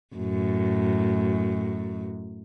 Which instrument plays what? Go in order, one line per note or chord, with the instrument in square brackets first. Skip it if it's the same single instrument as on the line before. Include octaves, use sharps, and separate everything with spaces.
[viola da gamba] F#2 A2